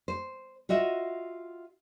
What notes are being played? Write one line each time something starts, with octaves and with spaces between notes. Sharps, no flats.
C5
F4 F#4 D#5 E5 F#5